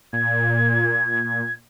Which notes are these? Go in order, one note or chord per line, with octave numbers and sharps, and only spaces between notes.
A#2 G#6